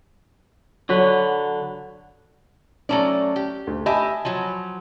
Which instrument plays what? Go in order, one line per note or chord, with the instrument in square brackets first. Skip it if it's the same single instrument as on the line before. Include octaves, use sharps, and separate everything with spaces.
[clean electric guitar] D3 [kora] F#3 F#4 B4
[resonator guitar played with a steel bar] F#3 A3 D5 [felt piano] C#4 A5
[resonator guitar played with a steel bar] G4
[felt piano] D2
[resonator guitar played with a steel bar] G4 D#5 E5 [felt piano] G#5 A5 B5
[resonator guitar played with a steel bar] F3 F#3